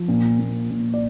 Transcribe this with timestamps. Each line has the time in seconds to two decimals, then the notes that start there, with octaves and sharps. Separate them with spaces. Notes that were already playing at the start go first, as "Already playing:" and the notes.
Already playing: F3
0.08 A#2
0.39 A#2
0.70 A#2
0.94 D5